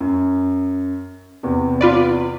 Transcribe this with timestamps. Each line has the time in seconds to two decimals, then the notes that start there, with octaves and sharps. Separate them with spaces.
0.01 F#2
1.43 E2 C3
1.81 F4 B4 D5